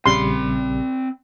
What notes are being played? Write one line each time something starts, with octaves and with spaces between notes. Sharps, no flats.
A#1 C#3 G3 C4 B5 C6